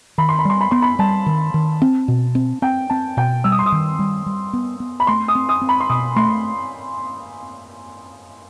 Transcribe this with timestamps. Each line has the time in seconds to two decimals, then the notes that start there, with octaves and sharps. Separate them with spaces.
0.18 D#3 B5
0.29 C6
0.39 B5
0.45 G3 C6
0.61 B5
0.71 B3 C6
0.82 B5
0.99 G3 A5
1.26 D#3
1.54 D#3
1.82 C4
2.08 B2
2.35 C4
2.62 C4 G5
2.90 C4 A5
3.17 B2 G5
3.44 G3 E6
3.52 D#6
3.59 C6
3.66 D#6
3.72 D#3
3.99 G3
4.26 G3
4.53 B3
4.80 B3
5.00 B5
5.07 A3 C6
5.28 D#6
5.35 C4
5.49 D#6
5.61 C4
5.69 B5
5.80 C6
5.89 B2 D#6
6.16 A3 C6